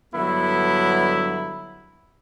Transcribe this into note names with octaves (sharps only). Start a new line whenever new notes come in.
G2 D3 F#3 B3 E4